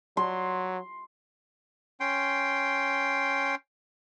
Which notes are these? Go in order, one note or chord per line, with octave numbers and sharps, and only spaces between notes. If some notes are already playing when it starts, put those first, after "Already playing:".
F#3 C6
C#4 G5 C6